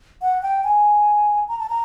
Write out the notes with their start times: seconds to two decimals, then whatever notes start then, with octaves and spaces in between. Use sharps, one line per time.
0.22 F#5
0.43 G5
0.64 G#5
1.48 A#5
1.59 A5
1.69 A#5